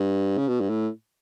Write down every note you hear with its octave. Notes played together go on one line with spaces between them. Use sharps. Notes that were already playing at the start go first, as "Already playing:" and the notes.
Already playing: G2
C#3
B2
G2
A2